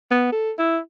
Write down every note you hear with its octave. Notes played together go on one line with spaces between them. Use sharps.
B3
A4
E4